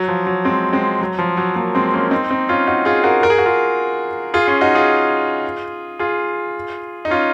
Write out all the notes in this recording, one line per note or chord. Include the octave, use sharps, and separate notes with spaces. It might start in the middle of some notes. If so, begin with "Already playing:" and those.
Already playing: F#3
F3
F#3
G#3 C4
G#3 C4
F#3
F3
F#3
F#3 A#3
G#3 C4
A#3 C#4
C4 D#4
C4 D#4
C#4 F4
D#4 F#4
F4 G#4
F#4 A#4
A#4
G#4
F#4
F4 G#4
F4 G#4
C#4 F4
D#4 F#4
F4 G#4
F4 G#4
D#4
C#4 F4